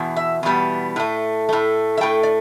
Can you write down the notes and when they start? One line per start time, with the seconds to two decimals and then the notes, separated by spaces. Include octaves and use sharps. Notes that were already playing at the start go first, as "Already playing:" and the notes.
Already playing: E2 B2
0.16 E5
0.43 E2 B2 G3 B3
0.96 A2 A3
1.49 A2 A3
1.97 E5
2.01 A2 A3 G5
2.23 D5